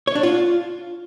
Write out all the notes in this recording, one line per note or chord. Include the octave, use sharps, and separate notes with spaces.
C#5
D4
F4